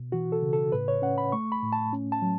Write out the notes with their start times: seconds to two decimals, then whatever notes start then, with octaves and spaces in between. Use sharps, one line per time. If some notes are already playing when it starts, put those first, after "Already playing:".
Already playing: B2
0.12 E3 F#4
0.32 A4
0.42 C#3
0.53 A4
0.72 A2 B4
0.88 C#5
1.02 C#4 F#5
1.18 B5
1.32 A3 C#6
1.52 B5
1.62 A2
1.73 A5
1.93 C#4
2.12 A5
2.22 F#3